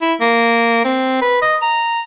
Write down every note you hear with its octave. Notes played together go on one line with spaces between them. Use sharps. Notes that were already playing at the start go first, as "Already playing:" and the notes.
E4
A#3
C4
B4
D#5
A#5